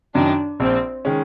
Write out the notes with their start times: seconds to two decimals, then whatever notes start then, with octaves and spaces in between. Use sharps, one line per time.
0.14 F#2 D#3 D4
0.60 A#1 C4
1.05 D#3 G#3 C#4